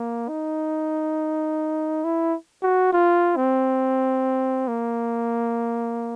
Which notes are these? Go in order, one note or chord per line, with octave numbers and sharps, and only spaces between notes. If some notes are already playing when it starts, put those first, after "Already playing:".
Already playing: A#3
D#4
E4
F#4
F4
C4
A#3